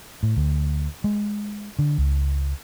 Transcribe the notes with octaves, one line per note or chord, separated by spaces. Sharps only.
A2
D2
G#3
D3
C#2